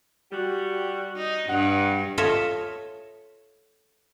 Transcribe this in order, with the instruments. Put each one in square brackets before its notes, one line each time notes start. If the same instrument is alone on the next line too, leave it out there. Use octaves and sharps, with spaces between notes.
[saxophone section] G3 F#4 G4
[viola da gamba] D#4
[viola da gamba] G2 [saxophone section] F#5
[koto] F4 A4 C#5 D#5 E5